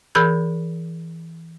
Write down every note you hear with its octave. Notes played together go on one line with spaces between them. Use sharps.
E3 G#4 A#4 B5 G6 G#6